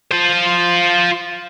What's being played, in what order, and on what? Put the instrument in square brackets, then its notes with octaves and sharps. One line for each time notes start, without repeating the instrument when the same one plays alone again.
[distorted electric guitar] F4 C5